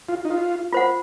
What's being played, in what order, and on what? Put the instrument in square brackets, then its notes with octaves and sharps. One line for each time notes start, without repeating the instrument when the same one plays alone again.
[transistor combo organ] F4
D#4
F4
[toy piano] F4 C5 F#5